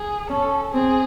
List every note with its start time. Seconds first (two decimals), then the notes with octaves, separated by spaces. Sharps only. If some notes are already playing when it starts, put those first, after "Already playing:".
Already playing: G#4
0.30 C#4 A4
0.74 C4 G#4